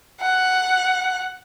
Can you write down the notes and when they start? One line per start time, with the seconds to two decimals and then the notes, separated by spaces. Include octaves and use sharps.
0.21 F#5